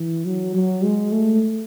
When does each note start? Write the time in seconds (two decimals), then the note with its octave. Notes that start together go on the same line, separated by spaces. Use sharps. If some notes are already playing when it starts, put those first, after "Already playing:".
Already playing: E3
0.25 F#3
0.55 F#3
0.83 G#3
1.12 A3